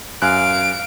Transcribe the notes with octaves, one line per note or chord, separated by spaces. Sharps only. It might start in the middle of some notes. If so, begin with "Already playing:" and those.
F#2 F5 G#5 F#6 D7